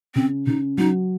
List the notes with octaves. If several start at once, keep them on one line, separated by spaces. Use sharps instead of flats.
C#3 C4
C#3 D#4
F#3 D#4